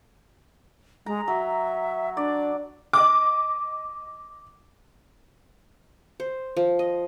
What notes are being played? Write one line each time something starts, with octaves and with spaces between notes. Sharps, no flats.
G#3 A#5
F#3 E5
D4 D5
D#5 D6
C5
F3
D#5